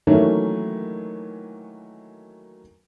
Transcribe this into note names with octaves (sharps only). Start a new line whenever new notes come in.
D#3 E3 F#3 A3 A#3 C#4